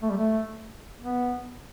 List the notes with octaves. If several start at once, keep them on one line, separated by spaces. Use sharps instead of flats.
A3
G3
A3
B3